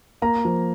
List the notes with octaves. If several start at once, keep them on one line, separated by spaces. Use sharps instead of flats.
A#3 A#5
F3